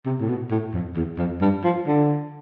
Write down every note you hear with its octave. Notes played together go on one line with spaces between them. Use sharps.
C3
A2
B2
A2
F2
E2
F2
G2
F3
D3